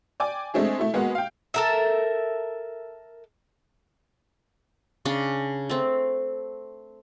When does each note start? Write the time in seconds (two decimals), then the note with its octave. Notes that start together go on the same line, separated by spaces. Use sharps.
0.20 D5 G5 G#5 D6
0.54 G#3 A3 C4 D4 G#4
0.79 A3 E4
0.94 G#3 A#3 B3 F#4 F#5
1.15 F5 G5
1.54 A4 A#4 E5
5.05 C#3 C#4 D4
5.70 A3 C4